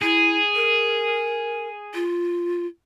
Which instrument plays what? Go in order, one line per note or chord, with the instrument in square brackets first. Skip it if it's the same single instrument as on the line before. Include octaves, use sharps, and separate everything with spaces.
[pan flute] E4 [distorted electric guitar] G#4
[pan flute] A#4
F4